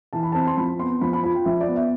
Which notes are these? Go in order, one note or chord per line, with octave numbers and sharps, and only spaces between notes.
E3 A5
B5
C4 A5
C6
F3 B5
B3 C6
F3 B5
B5
F4 B5
G5
F3 E5
D5
B3
E5